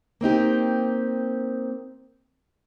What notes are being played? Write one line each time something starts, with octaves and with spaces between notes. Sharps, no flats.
A#3 C4 D#4 G4